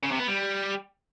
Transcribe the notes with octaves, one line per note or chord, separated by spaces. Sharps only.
C#3
C3
B3
G3